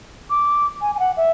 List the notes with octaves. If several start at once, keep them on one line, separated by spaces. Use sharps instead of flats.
D6
G#5
G#5
F#5
E5